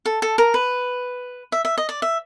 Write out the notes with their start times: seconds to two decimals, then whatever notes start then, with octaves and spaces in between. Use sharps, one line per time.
0.06 A4
0.22 A4
0.38 A#4
0.54 B4
1.52 E5
1.65 E5
1.78 D#5
1.89 D5
2.02 E5